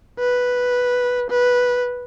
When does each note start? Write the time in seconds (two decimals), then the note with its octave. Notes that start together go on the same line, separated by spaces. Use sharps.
0.19 B4
1.30 B4